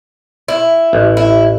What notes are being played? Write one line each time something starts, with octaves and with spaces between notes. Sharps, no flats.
E4
A1
E4